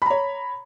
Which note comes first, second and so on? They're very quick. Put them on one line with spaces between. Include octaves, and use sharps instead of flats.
B5 A#5 C#5